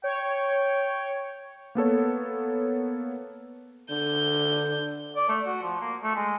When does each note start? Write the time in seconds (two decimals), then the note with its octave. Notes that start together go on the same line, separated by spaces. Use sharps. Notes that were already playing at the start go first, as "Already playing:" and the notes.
0.04 C#5 G5
1.75 A#3 B3 A4 C#5
3.90 D3 G6
5.16 D5
5.29 A3
5.46 F#4
5.62 F3
5.81 A#3
6.04 A3
6.15 G#3